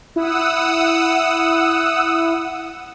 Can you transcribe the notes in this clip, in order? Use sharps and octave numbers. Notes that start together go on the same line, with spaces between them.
E4 F#5 D#6 E6